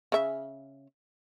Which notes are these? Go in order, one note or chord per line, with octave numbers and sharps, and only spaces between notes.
C#3 E5